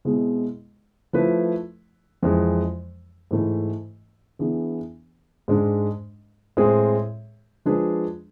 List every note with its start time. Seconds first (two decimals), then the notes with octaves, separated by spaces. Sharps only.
0.05 B2 G#3 C4 E4 G#4
1.13 F3 A3 E4 B4
2.22 F2 E3 G#3
3.31 G#2 E3 A3 E4
4.39 E3 B3 D4 G#4
5.48 G#2 G#3 D4
6.57 A2 G#3 C4 G#4
7.65 F3 G#3 D4 G#4 B4